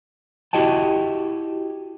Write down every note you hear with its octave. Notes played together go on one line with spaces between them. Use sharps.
E4 F#4 G4 D#5 G5 A5